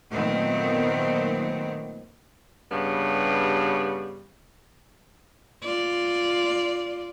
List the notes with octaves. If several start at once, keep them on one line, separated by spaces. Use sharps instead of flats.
A#2 D#3 F#3 A3 B3 C4
G2 C#3 G3 B3
F4 D5